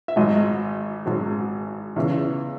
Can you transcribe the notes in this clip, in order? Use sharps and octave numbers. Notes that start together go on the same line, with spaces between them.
E5
G#1 G#2 F#3 D#5
G#1 G#2 F#3
E2 C#3 E3